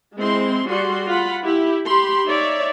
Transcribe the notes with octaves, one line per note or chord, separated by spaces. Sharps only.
G#3 C4 E4 C6
G3 F#4 G#4 D5 C6
F4 F#5 B5
E4 G4
G4 B5 C6
D#4 C#5 D5 E5